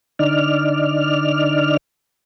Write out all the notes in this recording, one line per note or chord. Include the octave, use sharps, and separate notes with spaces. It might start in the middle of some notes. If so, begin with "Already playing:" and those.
D3 D#4 D5 F6